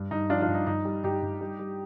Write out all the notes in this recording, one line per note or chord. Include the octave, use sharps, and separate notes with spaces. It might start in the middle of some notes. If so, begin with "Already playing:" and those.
Already playing: G2
G2 D#4
F3 D4 F4
D4 F4
G2
D#4
G2 D#4
G3
G2 D#4 G4
G2
G3
G3